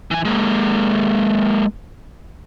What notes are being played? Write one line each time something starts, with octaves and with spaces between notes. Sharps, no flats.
E3 G#5
G#3 A#3